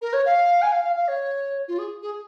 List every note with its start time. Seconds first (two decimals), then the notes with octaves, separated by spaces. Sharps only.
0.01 A#4
0.13 C#5
0.25 F5
0.62 G#5
0.72 F5
0.83 F5
0.96 F5
1.08 C#5
1.68 F4
1.78 G#4
2.02 G#4